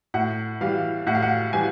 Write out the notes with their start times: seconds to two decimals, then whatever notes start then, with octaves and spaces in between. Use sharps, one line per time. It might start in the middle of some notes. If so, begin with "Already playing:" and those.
0.14 A2 F#5
0.61 E3 G3 F5
1.07 A2 F#5
1.15 F5
1.23 F#5
1.53 E3 G3 G#5